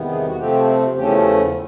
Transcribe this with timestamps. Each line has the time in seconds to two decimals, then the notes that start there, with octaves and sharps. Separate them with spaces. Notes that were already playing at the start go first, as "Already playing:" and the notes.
Already playing: E2 C3 D#3 G3 B3
0.08 G#4
0.26 F#4
0.38 C3 F3 A3 C4 G4
0.95 E2 C#3 F3 A3 C#4 G4